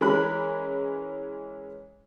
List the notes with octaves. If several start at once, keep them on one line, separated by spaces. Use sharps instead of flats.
E3 G#3 C#4 A#4 B5 F#6